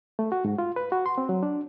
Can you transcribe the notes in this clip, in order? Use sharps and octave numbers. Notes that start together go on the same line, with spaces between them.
A3
F#4
G#2
F4
B4
F#4
C6
C4
F#3
D4